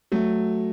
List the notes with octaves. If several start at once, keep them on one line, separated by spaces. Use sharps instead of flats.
F#3 A3